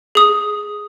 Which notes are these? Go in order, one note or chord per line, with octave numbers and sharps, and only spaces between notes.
G#4 D#6